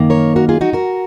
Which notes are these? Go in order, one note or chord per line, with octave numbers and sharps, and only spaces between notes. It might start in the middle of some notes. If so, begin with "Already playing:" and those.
Already playing: F#2 D#3 A#3
A#4 C#5
F#4 A#4
F4 G#4
D#4 F#4
F#4 A#4